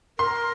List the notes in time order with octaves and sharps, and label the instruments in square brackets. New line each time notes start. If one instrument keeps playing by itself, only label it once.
[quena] A#4 [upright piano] C6